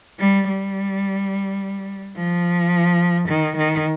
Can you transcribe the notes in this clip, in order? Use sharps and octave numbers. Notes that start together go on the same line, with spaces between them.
G3
G3
F3
D#3
D#3